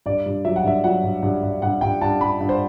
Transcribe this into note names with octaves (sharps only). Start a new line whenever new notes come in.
G2 D5
G2
F#3 E5
F#5
G2 E5
F#3 F#5
G2
G2
G2
G2 F#5
G2 G5
G2 A5
G2 B5
G2
C5